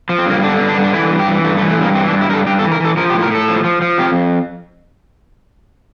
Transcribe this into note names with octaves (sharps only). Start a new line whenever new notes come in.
F3
C4
G2 A#3
D3 D4
G2
D4
D3
D4
E3 E4
G2
G4
E3
G2 A3
A3
E3
A3
G2 A#3
E3 C4
D4
G2
E4
G2 A4 A#4
G2 G4
A4
E3
A#4
E3 A4
F3 A#4
G4
A2
A#4
A2 A4
F3
F3
F3
F2 G4